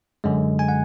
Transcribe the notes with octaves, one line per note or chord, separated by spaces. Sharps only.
F#2 D3 G#3
G#5
F#5